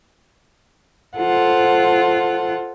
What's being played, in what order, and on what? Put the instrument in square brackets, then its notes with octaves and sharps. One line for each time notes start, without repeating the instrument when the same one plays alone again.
[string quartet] F4 A4 C5 F#5